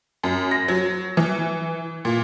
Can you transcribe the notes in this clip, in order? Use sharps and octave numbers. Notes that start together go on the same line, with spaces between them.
F#2
A#6
F#3
E3
A#2